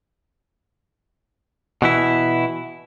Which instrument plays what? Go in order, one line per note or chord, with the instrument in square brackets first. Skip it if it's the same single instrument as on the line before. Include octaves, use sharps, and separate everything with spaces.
[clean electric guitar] B2 E3 E4